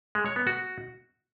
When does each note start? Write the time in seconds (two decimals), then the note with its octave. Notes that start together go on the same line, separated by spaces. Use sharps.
0.15 G#3
0.26 C#5
0.36 B3
0.47 F#4